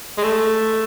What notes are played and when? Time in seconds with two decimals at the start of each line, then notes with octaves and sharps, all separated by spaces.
0.18 G#3
0.24 A3